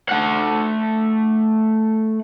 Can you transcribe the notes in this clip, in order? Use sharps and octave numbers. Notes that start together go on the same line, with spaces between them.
A3 F#5